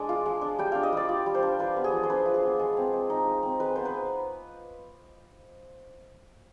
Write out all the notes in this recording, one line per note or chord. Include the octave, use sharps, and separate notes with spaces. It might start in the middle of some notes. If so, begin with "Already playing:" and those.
Already playing: G#3 D4 D6
F4
G#3
D4
G3 G5
D4 F5
D#5
G3 D5
F4
G3
C5
D4
F4 B4
B3
G#4
F3
C5
D4 B4
F4
G#4
B3
G#3
C4
G#3
D#4
G#3
C4
G#3 B4
B3 C5
B4